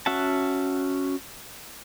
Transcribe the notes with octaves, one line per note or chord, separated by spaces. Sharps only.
C#4 F#4 E5 F#5 A5